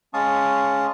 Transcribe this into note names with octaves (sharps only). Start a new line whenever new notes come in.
G#3 C#4 F5 A5 C#6 D#6